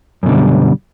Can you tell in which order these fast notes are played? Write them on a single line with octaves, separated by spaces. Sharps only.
F#2 B2 D3 G3